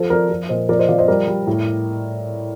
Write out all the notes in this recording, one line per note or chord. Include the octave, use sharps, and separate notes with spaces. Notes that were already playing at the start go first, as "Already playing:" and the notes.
Already playing: F3 A4 C5
F3 A#4 D5
F3
A#2 C5 D#5
F3 A#4 D5
C5 D#5
F3 D5 F5
C5 D#5
G3 A#4 D5
G3
A2